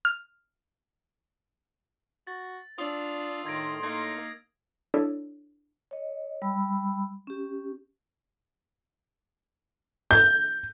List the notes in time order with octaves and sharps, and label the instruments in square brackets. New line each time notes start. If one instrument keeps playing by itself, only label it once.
[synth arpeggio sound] F6
[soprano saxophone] F#4 [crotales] A6
[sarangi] D4 [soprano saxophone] F4 [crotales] D#6 E6
[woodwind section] A2 C6 [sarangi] D#3 [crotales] G#6 A#6 D7
[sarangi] A#3 [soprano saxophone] D#4 [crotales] G#6
[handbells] D4 E4 A4 C#5 D5
[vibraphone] C#5 D#5
G3 B5 E6
C#4 G4
[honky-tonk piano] G6